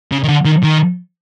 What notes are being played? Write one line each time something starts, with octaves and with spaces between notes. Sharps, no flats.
C#3
D#3
D3
D#3
D#3